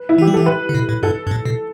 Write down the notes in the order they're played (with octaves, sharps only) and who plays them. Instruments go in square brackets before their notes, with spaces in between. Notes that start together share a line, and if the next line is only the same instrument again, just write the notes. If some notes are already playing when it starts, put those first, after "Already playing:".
Already playing: [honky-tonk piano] B4
E4
[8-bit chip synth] E3 [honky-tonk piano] G4
[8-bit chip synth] G3
[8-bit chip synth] E3 [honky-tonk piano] A4
[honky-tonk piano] B4
[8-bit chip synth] D3
B2
A2
[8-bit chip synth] G2 [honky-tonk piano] A4
[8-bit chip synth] G2
A2
B2